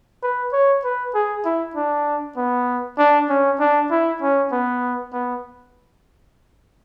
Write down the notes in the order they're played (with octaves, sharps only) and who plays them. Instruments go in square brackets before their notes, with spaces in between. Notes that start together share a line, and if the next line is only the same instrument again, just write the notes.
[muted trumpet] B4
C#5
B4
G#4
E4
D4
B3
D4
C#4
D4
E4
C#4
B3
B3